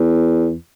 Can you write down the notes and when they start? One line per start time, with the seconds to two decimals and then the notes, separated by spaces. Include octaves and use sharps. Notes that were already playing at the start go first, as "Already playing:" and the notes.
Already playing: E2